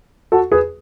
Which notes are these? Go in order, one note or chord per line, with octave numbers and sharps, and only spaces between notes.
F#4 A4
G#4 B4